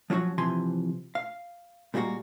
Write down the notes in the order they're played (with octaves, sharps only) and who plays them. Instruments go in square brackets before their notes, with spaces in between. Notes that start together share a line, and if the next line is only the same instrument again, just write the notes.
[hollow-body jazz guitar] F3 F#3 C#4 F4 F#4
C3 E3 F3 G#5 C6
F5
A#2 G3 G#3 A#3 F#4